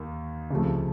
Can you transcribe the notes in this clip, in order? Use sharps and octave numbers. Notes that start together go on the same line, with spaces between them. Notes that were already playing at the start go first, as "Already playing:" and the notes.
Already playing: D#2 D#3
C#2 C3 F3 A3